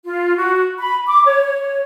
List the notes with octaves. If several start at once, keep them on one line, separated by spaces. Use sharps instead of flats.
F4
F#4
B5
D6
C#5
C#5